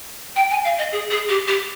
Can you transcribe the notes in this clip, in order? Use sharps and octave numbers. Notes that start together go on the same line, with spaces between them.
G5
G#5
F5
D#5
G#4
G#4
G4
G4